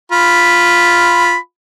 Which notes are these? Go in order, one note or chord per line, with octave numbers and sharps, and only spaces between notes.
F4 B5